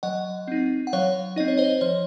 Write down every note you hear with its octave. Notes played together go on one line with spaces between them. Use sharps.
F#3 D#5 F#5
C4 D#4
F#5
F#3 C#5 F5
C4 D#4 D#5
C#5
C5 D#5
F3 C#5